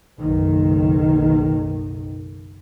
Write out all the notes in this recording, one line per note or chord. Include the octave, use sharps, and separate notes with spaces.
F#1 B1 D#3